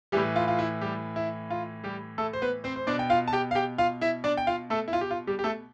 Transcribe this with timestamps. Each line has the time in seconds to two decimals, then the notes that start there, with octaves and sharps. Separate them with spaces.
0.12 A2 E3 G3 G4
0.36 F4
0.48 F4
0.59 E4
0.81 G3 G4
1.16 E4
1.50 F4
1.84 G3 G4
2.18 A3 A4
2.33 C5
2.42 B3 B4
2.64 C4 C5
2.76 C5
2.87 B2 D4 D5
2.99 G5
3.10 F4 F5
3.28 A5
3.33 G4 G5
3.51 F5
3.55 G4 G5
3.78 F4 F5
4.01 E4 E5
4.24 D4 D5
4.37 G5
4.47 F4 F5
4.70 A3 A4
4.88 E4
4.93 F4
5.01 G4
5.11 F4
5.27 G3 G4
5.39 G4
5.44 A3 A4